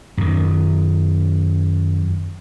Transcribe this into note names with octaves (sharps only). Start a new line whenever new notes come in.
F#2 D#3